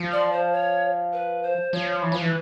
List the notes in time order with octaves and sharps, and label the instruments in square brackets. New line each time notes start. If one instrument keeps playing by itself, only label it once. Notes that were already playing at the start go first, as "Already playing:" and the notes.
Already playing: [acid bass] F3
[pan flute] D5
C5
C#5
B4
C5
[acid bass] F3 [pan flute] C#5
[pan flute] C#5
[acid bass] E3
[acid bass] F3 [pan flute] B4
[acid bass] E3